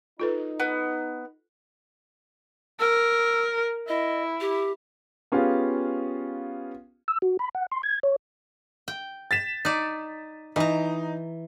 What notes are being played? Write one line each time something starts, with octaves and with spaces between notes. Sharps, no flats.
D#4 F4 A4 B4
B3 F#5
A#4 E6
E4 D#5
G4
B3 C#4 F4 G4 G#4 F5
E6
F#4
B5
F#5
C6
G#6
C#5
G5
A6 B6 E7
D#4 D5
E3 D#4 A#5